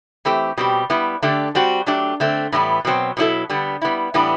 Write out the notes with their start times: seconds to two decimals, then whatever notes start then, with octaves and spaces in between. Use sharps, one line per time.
0.25 E3 A3 C4 G4
0.57 B2 G3 C4 G4
0.90 G3 B3 E4
1.22 D3 A3 D4 G4
1.55 G3 C4 F#4
1.86 F#3 A3 D4 G4
2.20 D3 A3 C4
2.52 A2 E3 G3 B3
2.85 B2 F#3 C4
3.17 B2 F#3 C4 E4 A4
3.50 D3 G3 B3
3.82 G3 B3 E4
4.14 A2 E3 G3 B3 D4